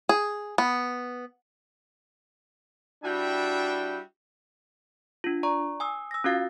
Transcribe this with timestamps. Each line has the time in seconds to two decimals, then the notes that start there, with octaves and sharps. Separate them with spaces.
0.09 G#4
0.58 B3
3.04 G3 D4 E4 F#4 E5 G5
5.24 D4 F4
5.43 D5 A#5 C#6
5.80 G#5 D#6 E6
6.11 E6 A#6
6.24 C#4 F4 F#4 F5 A6 A#6